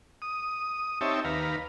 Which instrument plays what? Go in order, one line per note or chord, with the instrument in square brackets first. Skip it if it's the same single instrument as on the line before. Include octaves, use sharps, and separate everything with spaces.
[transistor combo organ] D#6
C4 D#4 G4 C#5 E5 A5
D#2 B4 F5 A#5